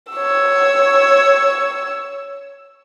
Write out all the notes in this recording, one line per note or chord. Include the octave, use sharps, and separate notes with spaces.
C#5 E6